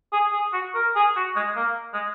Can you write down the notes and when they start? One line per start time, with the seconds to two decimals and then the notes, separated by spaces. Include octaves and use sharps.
0.12 G#4
0.32 G#4
0.53 F#4
0.75 A#4
0.95 G#4
1.16 F#4
1.35 G#3
1.56 A#3
1.93 G#3